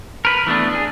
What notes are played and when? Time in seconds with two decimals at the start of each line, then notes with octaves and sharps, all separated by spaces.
0.25 A#4 B4
0.47 E3 A3 B3 D4
0.73 D4 G#4